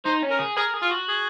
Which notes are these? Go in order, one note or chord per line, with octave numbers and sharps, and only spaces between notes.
D#4 C5
C#4
A#4
G#4
G#4 A#4
G#4
F4
F#4
G#4